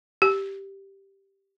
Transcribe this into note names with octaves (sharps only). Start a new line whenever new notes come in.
G4